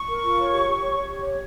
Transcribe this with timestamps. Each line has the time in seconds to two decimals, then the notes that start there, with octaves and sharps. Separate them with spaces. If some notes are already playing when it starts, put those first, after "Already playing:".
Already playing: C#6
0.09 A#4
0.23 F4
0.37 C#5
0.52 G4
0.67 G4
0.81 C#5
0.96 C#5
1.11 G4
1.27 C#5